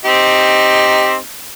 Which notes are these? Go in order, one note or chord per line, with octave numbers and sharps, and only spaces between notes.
C4 D#4 G4